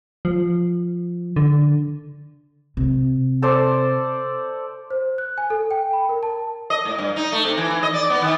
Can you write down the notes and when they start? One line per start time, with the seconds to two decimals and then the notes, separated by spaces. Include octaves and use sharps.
0.25 F3
1.36 D3
2.77 C3
3.42 A4 C5 D5
4.91 C5
5.18 F#6
5.38 G#5
5.50 A4
5.71 G5
5.93 B5
6.09 A#4
6.23 A5
6.70 D#5
6.85 A2
6.99 G2
7.16 D#4
7.32 A3
7.45 C3
7.57 E3
7.70 E3
7.83 D#5
7.94 D5
8.10 B3
8.22 D#3